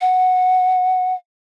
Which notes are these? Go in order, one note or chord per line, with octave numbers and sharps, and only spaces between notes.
F#5